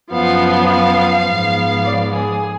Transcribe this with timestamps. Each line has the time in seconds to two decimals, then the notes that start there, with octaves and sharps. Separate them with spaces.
0.11 F#2 F3 B3 F5
0.69 F5
1.27 G#2 F3 B3
1.85 D5
2.14 G#4